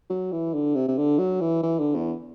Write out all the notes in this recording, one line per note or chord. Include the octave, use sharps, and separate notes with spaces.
F#3
E3
D3
C3
C3
D3
F#3
E3
E3
D3
E2